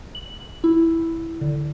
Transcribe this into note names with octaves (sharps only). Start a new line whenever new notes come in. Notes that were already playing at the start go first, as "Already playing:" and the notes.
F#7
E4
D3